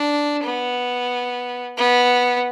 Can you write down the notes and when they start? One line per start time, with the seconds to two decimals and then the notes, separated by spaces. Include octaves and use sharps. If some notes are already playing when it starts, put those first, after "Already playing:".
Already playing: D4
0.43 B3
1.78 B3